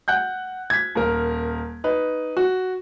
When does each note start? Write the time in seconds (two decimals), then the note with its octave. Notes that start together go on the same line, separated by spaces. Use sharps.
0.08 F#5 F#6 G6
0.70 G#6 B6
0.95 D#1 A#4
1.84 D#4 B4
2.37 F#4